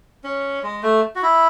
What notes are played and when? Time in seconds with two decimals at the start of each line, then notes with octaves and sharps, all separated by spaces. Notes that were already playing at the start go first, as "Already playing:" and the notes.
0.24 C#4
0.63 G#3
0.83 A3
1.16 F#4
1.23 E4